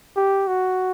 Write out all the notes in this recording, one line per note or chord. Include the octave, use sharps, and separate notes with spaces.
G4
F#4